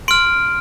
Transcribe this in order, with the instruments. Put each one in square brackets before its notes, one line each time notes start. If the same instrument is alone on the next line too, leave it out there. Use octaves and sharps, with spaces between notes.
[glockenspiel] C6 F6 D7